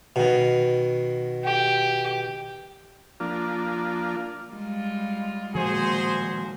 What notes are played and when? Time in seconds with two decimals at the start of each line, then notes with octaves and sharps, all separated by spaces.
0.16 B2 D#3
1.44 G4
3.20 F3 A#3 D4 F4
4.53 G3 G#3 F4
5.55 A#2 D#3 F3 G#3 F#4 G#4 C5